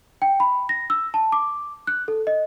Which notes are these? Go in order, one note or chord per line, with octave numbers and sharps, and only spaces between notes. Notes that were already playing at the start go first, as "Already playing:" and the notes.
G5
B5
A#6
E6
A5
D6
F#6
A4
D#5